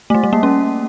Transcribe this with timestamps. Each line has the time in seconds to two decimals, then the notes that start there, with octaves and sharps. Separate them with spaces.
0.10 A3
0.14 G3
0.23 A3
0.33 A#3
0.43 C#4